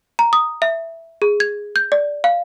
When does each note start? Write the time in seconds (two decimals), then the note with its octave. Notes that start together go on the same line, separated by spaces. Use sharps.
0.19 A#5
0.33 D#6
0.62 E5
1.22 G#4
1.40 G#6
1.76 G6
1.92 D5
2.24 F5